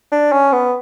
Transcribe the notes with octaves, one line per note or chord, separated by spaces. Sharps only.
D4
C#4
B3